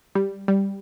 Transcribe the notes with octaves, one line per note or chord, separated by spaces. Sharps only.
G3
G3